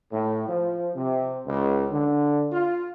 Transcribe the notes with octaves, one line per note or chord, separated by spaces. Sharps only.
A2
F3
C3
C#2
D3
F4